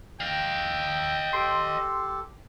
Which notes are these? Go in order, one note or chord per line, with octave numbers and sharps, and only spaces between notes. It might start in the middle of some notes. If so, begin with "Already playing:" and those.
D#5 F5 G5
G4 A4 C6